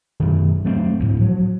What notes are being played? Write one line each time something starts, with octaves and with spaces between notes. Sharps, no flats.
F#2 D#3
F#3 A3 B3 C4
D2 A2
F3 F#3